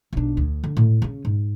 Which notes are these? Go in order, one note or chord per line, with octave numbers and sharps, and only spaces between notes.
B1 D4
D2
D3
A2
C#3 C#4
G#2